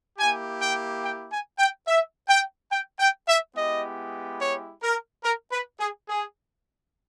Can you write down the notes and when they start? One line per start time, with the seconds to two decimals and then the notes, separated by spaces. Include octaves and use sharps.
0.19 A#3 E4 G4 G#5
0.60 G5
1.03 G5
1.31 G#5
1.59 G5
1.88 E5
2.29 G5
2.71 G5
2.99 G5
3.28 E5
3.55 G#3 B3 E4 G4 D#5
4.40 C#5
4.82 A#4
5.24 A#4
5.52 B4
5.80 G#4
6.09 G#4